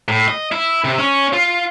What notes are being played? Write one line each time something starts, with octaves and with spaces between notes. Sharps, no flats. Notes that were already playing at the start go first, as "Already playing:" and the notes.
A2
D#5
E4
C3
C#4
F4